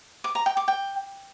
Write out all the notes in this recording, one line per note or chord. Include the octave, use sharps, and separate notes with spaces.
D6
A#5
G5
D6
G5